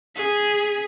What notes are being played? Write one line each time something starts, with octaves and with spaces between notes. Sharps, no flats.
G#4 B6